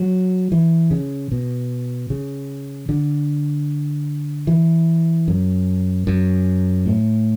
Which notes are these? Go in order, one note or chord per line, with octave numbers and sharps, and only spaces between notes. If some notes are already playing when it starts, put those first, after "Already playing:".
Already playing: F#3
E3
C#3
B2
C#3
D3
E3
F#2
F#2
A2